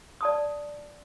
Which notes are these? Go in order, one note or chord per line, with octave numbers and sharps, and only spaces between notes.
D5 A5 D#6